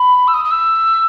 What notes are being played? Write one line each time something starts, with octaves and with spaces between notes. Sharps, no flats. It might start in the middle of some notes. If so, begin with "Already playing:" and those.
Already playing: B5
E6
D#6
D#6
E6